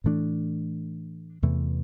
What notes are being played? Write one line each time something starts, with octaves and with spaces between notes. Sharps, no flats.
A2 E3 A3 D4
E2 C3 E3 A3